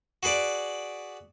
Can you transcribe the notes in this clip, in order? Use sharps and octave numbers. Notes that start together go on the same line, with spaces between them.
F#4 G#4 B4 D5